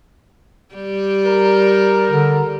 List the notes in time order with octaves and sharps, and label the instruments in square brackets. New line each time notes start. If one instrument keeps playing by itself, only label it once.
[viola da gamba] G3 G4
[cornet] A#4
[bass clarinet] D3